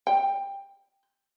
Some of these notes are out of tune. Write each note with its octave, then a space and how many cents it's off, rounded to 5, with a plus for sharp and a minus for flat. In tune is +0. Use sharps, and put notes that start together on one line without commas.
G5 +15